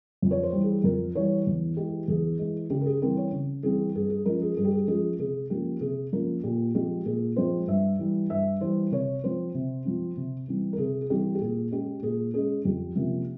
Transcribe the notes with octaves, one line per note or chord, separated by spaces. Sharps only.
F2
C#5
C5
E3 G3
G#4
F2 A#4
E3 G3 C#5
E2
E3 G#3 G4
E2 G#4
E3 G#3
C#3 G4
A#4
G#4
E3 G3 C4 A#4
C#5
C#3
E3 G3 C4 G#4
G2 G#4
G#4
F3 G#3 C#4 A#4
G#4
G2 G#4
G4
G#4
F3 G#3 C#4 G#4
C3 G#4
F3 A#3 C#4 G4
C3 G#4
F3 A#3 C#4 A#4
A#2 G4
F3 G#3 C4 G4
A#2 G#4
F3 G#3 C4 C5
G2 E5
E3 G3
G2 E5
E3 G3 C5
C3 C#5
F3 C4 C5
C3
F3 C4
C3
E3 G3 C4
A#4
C3 G#4
G#4
E3 G3 C4 G4
G4
A#2 G#4
G#3 C#4 G4
A#2 G#4
G#3 C#4 G#4
F2 G4
C3 F3 A#3 C#4